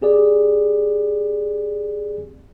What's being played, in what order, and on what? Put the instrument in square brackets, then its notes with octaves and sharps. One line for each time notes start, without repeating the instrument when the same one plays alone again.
[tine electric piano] C4 G4 G#4 D5